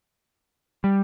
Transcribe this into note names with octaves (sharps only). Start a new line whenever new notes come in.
G3